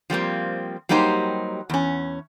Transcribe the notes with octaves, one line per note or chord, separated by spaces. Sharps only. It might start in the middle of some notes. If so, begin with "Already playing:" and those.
F3 G3 A#3 C4
F#3 G3 A#3 D#4 G4 C5
E2 C#4